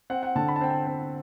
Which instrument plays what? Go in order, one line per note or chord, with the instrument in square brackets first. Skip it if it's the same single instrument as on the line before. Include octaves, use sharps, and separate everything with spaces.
[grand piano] C4 F#5
F#5
D3 A5
B5
A5
C4 G5
A5
C4